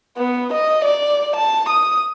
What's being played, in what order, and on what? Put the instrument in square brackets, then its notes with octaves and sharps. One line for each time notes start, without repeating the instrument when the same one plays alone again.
[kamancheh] B3
D#5
D5
A5
D#6